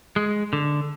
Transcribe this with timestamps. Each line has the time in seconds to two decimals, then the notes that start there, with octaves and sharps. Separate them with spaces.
0.16 G#3
0.53 D3